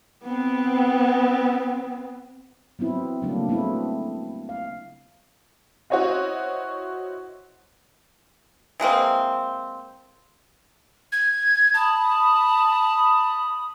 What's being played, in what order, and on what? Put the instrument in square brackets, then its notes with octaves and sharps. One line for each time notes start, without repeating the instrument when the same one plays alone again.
[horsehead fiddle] B3 C4
[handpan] F#3 B3 C4 E4
C#3 F#3 G3 A3 A#3 D4
F#3 A3 B3 C4 E4
F5
[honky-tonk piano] E4 F#4 C5 C#5 D#5 F#5
[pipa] E3 G#3 A#3 C4
[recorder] G#6
[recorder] A5 [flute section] B5 D#6